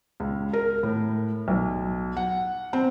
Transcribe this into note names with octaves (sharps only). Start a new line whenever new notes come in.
C#2
A#4
A2
B1
F#5
C4